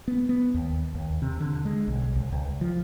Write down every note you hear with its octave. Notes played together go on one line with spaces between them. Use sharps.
B3
B3
D#2
D#2
C3
D3
G#3
B1
C2
C#2
F3